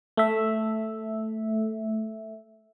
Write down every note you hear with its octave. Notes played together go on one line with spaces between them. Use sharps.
A3 E5